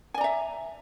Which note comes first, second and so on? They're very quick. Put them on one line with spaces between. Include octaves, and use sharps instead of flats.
G#5 D5 A#5 E5